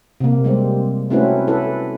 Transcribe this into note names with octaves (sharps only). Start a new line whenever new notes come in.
C3 A#3
G3 G#3 C4
A3 C4 C#4 E4 F#4 B4
E4 A4 B4